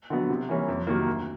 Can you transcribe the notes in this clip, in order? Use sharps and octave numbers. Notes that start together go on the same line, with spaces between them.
D3 F#3 B3
C3
E3 G3 A#3 C#4
F2
C3 D#3 F#3 A#3
D2